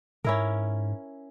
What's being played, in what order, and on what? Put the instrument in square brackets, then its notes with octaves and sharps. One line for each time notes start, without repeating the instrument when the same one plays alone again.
[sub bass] G#2 [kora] C#4 E4 A#4